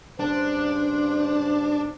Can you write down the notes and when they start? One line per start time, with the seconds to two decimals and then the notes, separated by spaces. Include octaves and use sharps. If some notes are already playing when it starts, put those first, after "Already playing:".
0.20 G2 C#3 D4 C5